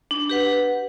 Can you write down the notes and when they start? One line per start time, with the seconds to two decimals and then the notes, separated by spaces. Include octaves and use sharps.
0.11 D4
0.29 G4 B4 F#5